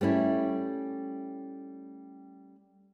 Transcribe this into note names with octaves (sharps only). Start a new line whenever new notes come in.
G3 A3 C#4 E4